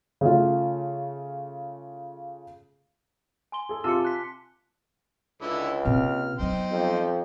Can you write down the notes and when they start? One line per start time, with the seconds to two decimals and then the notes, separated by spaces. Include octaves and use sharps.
0.21 C#3 A3 F4
3.52 G#5 C6 G7
3.69 G#4 A4
3.84 C3 F4 A5 D6 E6 C#7
4.05 F#6 B6
5.41 C#2 D3 E4 C#5
5.85 C3 A#3 F6
6.39 F#3 B3 D#4 C5 G5
6.71 F2